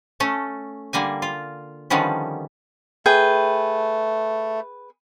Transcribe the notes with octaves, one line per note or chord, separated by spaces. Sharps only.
A3 C#4 A4
D3 G3 A#3 G#5
F4
D3 D#3 F3 G3 B3 C#4
A3 G#4 B4 G5